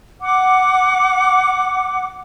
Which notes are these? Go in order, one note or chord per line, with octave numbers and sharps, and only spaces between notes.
F#5 D6